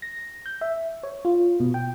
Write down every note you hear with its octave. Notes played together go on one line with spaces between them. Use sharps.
A#6
G6
E5
C#5
F4
B2
G5